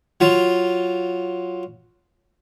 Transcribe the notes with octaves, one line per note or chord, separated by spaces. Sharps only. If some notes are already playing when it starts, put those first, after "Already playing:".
F#3 F4